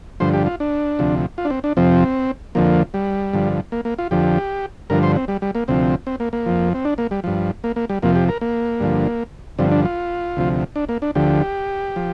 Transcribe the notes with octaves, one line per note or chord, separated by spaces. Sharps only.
G2 D3 F3 C5
G4
F4
D4
D2 C3 F3
F4
D4
C4
D4
F2 C3 F3 C4
F2 D3 F3 A#3
G3
G2 D3 F3
A#3
A#3
F4
F2 D3 F3 G4
G2 D3 F3 A#4
C5
C4
G3
G3
A#3
D2 C3 F3 C4
C4
A#3
A#3
F2 F3
C4
D4
A#3
G3
G2 F3
A#3
A#3
G3
F2 C3 F3 A#3
G4
A#4
A#3
G2 D3 F3
G2 D3 F3 C4
D4
F4
D2 C3 F3
D4
A#3
D4
D2 D3 F3 G4
F3